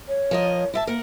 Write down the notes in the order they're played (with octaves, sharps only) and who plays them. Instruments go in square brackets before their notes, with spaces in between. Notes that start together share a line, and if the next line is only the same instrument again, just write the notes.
[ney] C#5
[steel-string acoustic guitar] F3 A#4 D#5
E4 E5 A5
[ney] A#3 [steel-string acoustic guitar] A#4 F#5